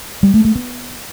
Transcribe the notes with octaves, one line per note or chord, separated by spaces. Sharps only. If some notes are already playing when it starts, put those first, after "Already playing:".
G3
A3
A3
B3